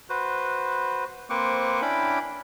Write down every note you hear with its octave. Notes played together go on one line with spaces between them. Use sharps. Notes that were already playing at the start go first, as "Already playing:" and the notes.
F#4 B4 C5
A#3 C4 B4 C5 C#6 D6
C#4 D4 E4 G5 B5 D6